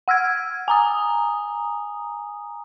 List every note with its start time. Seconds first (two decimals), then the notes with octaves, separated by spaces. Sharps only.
0.08 F#5 E6 F6 G#6
0.68 G#5 A#5 D#6